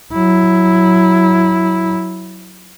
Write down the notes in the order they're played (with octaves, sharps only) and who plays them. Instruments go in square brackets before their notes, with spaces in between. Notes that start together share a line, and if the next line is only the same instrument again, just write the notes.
[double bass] F#3 E4